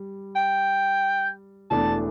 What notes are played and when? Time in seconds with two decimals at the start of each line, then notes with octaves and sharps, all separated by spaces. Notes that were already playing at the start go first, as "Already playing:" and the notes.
Already playing: G3
0.36 G5
1.71 E1 E2 E3 A3 D4 A5